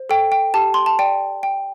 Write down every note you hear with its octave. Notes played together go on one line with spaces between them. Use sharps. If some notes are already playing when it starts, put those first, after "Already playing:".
Already playing: C5
A4 G5
G5
G4 A5
C6
A5
D5 G5
G5